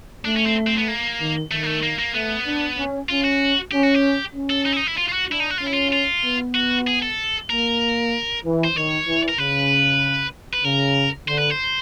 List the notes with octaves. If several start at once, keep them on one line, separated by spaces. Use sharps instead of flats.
A3 D4
C#4
C4
C4
B3
A#3
D#3
D#3 A3
A#3
A3
A#3
A#3
A3 B3
D4
C#4
C#4 F4
F#4
C#4 G4
F#4
G4
C#4
A4
D#4
E4
D#4
E4
F4
F4
F#4
D4 E4
D#4
F#4
F4
C#4
E4
F4
F4
B3
F#4
G#4
A4
A#3 A#4
E3
C5
D#3 C#5
E3
A#4
C#3 B4
B4
C#3 A#4
D3 C5
B4
C5